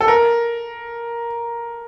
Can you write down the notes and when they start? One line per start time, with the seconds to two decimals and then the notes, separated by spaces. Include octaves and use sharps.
0.01 A4
0.08 A#4